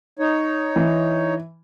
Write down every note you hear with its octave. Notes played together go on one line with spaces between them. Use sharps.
D#4 C#5
E3